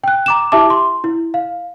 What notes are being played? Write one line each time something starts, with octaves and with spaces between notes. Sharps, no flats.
G5 F#6
A#5 D6 E7
E4 G4 E5 A5 D6
C6
E4
F5